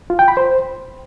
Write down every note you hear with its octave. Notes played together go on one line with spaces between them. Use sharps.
F4
G5
B5
C5